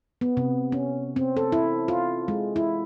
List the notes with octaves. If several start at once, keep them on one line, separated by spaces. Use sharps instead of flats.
B3
C3
C#4
C4
A4
E4
F4
G#3
E4